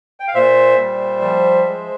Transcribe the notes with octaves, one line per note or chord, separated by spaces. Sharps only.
G5
F5
A#2 C5 E5
G3
F3
G#3